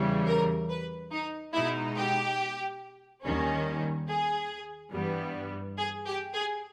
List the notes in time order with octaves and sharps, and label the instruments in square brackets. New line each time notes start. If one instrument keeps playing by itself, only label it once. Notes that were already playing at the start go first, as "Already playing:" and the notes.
Already playing: [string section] E2 C#3 E3 G3
A#4
B4
D#4
B2 G#3 D#4 E4
G4
D#2 D#3 G3 C#4
G#4
G2 E3 G3 B3
G#4
G4
G#4